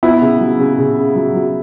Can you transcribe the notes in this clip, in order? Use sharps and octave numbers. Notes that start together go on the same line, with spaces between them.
B3 E4
C#3
F#3
C#3
C#3
C#3
F#3
F#3